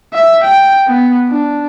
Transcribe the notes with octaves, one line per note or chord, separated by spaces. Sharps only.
E5
G5
B3
D4